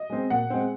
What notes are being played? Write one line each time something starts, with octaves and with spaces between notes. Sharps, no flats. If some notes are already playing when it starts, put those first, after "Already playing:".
Already playing: D#5
G#3 C4
A#2 F#5
G#3 C4